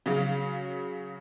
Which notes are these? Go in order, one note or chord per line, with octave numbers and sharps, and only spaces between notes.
C#3 F#3 F5